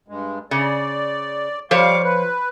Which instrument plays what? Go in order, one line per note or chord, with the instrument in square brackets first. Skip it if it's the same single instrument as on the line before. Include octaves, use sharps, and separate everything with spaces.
[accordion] G2 G#3
[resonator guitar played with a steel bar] C#3 [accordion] D5
[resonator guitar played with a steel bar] F3 C5 C#5 [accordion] G3 F5 D6
[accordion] B4